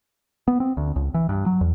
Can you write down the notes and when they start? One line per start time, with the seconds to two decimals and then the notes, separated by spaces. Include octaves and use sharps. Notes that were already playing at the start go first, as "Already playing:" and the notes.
0.48 B3
0.60 C4
0.77 D2
0.96 C#2
1.14 E3
1.29 G2
1.46 F#3
1.61 E2